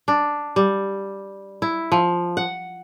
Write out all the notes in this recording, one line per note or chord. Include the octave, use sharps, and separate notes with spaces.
D4
G3
E4
F3
F#5